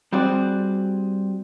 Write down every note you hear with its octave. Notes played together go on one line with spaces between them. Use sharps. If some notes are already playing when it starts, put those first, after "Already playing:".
G3 C4 F#4 G#4 D5